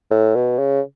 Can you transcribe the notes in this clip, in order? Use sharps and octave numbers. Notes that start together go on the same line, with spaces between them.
A2
B2
C#3